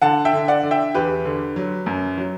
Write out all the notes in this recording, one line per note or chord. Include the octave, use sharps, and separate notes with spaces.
D3 F#5 A5
E5 G5
D3
D5 F#5
D3
E5 G5
E2 G4 B4
D3
F#3
F#2
F#3